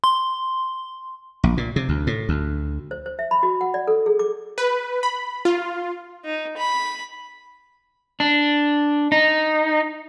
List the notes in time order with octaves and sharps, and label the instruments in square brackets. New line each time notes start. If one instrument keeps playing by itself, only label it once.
[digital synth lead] C6
[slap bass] A#1
A#2
C3
D2
A2
D2
[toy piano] C5
C5
E5
B5
F#4
F#5
D5
A4
G#4
D6
[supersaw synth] B4
B5
F4
[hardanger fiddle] D#4
B5
[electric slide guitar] D4
D#4